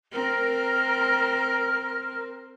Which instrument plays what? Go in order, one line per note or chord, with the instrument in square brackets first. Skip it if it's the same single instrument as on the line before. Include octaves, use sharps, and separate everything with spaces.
[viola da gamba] C4 [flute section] A#4 F6